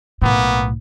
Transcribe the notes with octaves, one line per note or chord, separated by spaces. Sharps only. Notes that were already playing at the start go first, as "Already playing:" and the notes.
B1 A2 A#3 B3